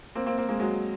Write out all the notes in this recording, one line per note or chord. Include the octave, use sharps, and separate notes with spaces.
A#3 C4
A#3 C4
A#3 C4
G#3 A#3
F#3 G#3